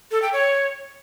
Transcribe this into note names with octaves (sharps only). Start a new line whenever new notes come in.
A4
G5
C#5